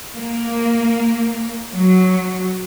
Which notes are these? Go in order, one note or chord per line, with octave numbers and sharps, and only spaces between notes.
A#3
F#3